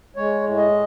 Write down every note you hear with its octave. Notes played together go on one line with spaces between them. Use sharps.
G#3 C#5
A2
D#5